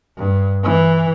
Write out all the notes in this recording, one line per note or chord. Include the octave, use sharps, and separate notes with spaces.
G2
E3